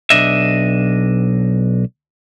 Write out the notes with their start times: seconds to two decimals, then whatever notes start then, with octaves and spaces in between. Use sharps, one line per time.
0.10 B1 D4 D#5 E5